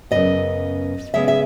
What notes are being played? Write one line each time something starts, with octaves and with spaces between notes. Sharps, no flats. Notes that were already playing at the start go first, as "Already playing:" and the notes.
F#2 C#3 E3 B3 D#5
C#3 G#3 B3 E5
E5